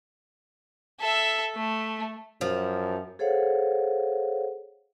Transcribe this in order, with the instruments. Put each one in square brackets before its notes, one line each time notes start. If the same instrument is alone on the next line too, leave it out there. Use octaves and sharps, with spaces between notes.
[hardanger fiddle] A4 E5
A3
[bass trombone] F#2 [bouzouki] F3
[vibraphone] G#4 A4 C5 C#5 F5 F#5